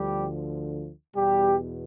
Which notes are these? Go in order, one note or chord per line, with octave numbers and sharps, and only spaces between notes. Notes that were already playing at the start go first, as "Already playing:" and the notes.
Already playing: D2 D3 F3 G3 G4
E2 B2 G3 G4